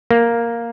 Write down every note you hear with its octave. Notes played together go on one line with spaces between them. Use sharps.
A#3